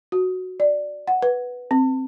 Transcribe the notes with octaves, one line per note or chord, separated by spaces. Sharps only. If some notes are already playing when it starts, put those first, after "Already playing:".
F#4
D5
F#5
B4
C4